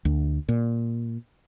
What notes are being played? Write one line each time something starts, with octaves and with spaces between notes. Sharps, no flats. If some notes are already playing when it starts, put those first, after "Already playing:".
D2
A#2